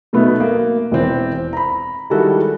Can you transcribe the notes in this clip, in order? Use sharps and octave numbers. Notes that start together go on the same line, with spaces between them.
B2 F#3 A3 B3 D#4
A#3
E1 E3 C4
A#5 B5
D#3 G3 G#3 E4 F#4 A4